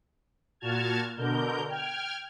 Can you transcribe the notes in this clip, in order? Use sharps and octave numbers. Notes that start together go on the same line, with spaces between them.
A#2 F#4 A5 F6 G#6
B2 D3 A#4 G6
G5 F6 G#6